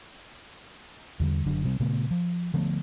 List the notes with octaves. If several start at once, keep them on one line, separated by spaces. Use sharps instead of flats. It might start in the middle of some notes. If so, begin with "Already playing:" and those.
E2 D3 G3
F#1 D3 F#3 D4
C3 G3 C4
A#2 C#3 A3 B3
F3
D3 F3 A3 B3